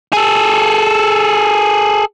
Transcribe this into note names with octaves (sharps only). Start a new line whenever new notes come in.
G#4 A4